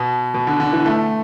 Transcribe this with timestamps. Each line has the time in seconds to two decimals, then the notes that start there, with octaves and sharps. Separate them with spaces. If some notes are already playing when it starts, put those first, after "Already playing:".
Already playing: B2
0.34 B2
0.47 D3
0.60 D3
0.73 E3
0.86 A3